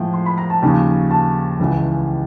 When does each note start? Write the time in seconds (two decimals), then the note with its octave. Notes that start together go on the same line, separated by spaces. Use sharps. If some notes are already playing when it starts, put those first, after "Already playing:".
Already playing: A2 F3 G#3
0.13 C6
0.26 B5
0.38 A#5
0.50 A5
0.62 D#2 C#3 F3
1.11 A5
1.60 C#2 C#3 E3 G#3